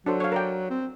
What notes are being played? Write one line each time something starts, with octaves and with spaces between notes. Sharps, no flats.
F#3 D4 A4 C5
C#5 F5
A#4 D5 G5
C4